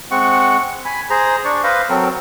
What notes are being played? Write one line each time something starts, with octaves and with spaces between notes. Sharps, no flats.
G#3 C4 F#5 C#6
G#5 B5
G#4 C5 A#5
D4 D5 C#6
B4 C5 D#5 F5
F#3 C4 A4 A#4